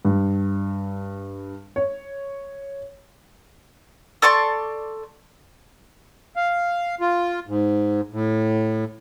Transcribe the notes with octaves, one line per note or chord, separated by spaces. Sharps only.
G2
C#5
A4 D5 C6 C#6
F5
F4
G#2
A2